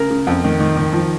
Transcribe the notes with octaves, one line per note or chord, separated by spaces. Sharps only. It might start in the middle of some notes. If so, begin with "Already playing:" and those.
Already playing: C#3 A#4
C#3
F2
D#3
D#3
D#3
F3